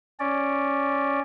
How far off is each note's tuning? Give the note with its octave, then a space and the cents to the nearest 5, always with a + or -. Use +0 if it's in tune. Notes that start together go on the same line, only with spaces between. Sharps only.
C#4 +0 D5 +0